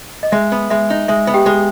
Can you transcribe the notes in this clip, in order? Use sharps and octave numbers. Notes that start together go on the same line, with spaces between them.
D#5
G#3 E5
B3
G#3 E5
D#4
G#3 E5
B3
G4 G5
G#3